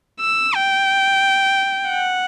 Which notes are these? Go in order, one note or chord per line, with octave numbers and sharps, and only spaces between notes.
E6
G5
F#5